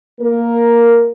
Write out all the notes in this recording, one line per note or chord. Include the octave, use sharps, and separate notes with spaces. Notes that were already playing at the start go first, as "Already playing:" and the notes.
A#3 A#4